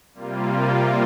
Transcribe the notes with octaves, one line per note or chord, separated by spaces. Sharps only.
C3 G3 A#3 F4